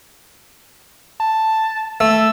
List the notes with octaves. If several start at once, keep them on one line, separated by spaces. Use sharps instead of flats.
A5
A3 E6